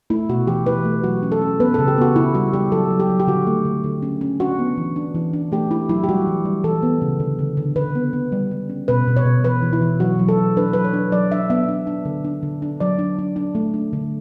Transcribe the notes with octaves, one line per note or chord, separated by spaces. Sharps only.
A3 E4
B2 F#4
E3 G4
E3 B4
A3
F#3 F#4
C#4
A4
C#4
B3 B4
C#3 A4
G4
B3 F#4
B3 E4
G3 F#4
G3 G4
F#3 A4
F#3
G4
F#3
G4
D3 F#4
A3
D3
D3
C#4
C#4
D4 F#4
B3
E3
D4
E3
D4
A3 G4
D4 E4
F#3 E4
G4
G3 F#4
E3
G3
E3 A4
B3
C#3
D3
D3
D3
D3 B4
B3
B3
G3
G3
C#4
B2 B4
B2
C#5
B2
E3 B4
E3
E4
E3
F#3 F#4
F#3
A4
F#3
D4 B4
F#3 B4
C#5
D4
F#3 D5
D4 E5
B3 E5
D4
D4
D3
D4
D3
D4
F#3 D5
D4
D4
D4
A3
D4
D3